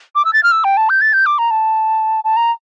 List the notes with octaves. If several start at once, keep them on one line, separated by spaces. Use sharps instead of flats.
D6
E6
A6
F6
E6
G5
A5
G6
A6
G6
D6
A#5
A5
A5
A#5